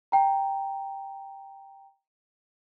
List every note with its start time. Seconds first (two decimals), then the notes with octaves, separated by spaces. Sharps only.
0.12 G5 A#5